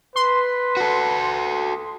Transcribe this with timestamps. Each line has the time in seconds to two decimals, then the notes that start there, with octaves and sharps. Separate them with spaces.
0.16 B4 C6
0.77 F#4 A4